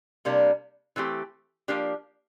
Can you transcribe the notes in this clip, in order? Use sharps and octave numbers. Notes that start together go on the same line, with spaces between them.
C3 G3 A#3 D4
E3 A3 C4 G4
F3 A#3 D4 G4